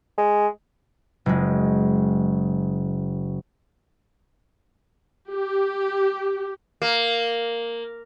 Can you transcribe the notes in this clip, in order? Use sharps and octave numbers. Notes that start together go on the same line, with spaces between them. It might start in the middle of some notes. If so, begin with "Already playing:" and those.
G#3
F#1 G#3
G4
A#3